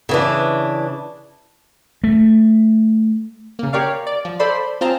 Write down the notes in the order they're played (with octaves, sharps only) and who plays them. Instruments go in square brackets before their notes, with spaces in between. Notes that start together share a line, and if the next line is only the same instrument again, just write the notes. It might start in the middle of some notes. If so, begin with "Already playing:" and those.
[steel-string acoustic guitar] C#3 E3 D4
[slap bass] A3
[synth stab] C#3 A#3
G4 A#4 C#5 D5 F5
D5
F3
A4 C5 D5 B5 C6
C4 F4 G#4 C5 A5 A#5